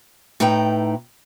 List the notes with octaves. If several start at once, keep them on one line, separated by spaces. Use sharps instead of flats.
A2 D#4 B4 G5 A#5